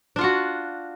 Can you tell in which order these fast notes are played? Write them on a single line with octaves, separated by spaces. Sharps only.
D4 F4 F#5 F#4